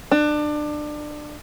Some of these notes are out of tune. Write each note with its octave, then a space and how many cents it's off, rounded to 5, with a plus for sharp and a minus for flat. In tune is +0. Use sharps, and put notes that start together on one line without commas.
D4 +25